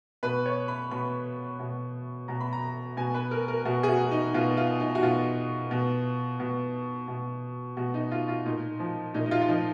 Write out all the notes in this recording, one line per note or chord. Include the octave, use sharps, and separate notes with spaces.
B2 B4
C#5
B5
B2 B5
B2
B2 A#5
B5
A#5
B2 G#5
B4
A#4
A#4
B2 F#4
G#4
F#4
D#4
B2 F4
F4
D#4
F#4
B2 F4
B2
B2
B2
B2 F#4
D#4
F4
F4
A#2 D#4
F3
A#2 D#4
D#4
F4
F4
F3 D#4